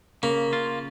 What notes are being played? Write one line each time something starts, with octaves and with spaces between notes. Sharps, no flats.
C#3 A#3
F4